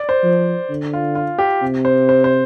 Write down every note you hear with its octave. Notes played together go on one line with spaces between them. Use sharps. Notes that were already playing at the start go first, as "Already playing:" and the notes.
Already playing: D5
C5
F3
D3
F4
F4
G4
C3
C5
C5
C5